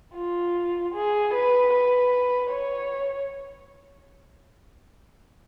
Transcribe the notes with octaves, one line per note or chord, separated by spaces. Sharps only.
F4
G#4
B4
B4
C#5